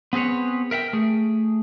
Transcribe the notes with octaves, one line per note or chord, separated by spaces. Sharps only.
B3 C4 G#4 B4 C#5
A#4 E5 F#5 G5
A3 G#4